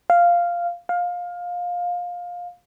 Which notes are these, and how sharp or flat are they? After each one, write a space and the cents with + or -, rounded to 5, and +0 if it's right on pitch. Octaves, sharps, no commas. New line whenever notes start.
F5 -5
F5 +20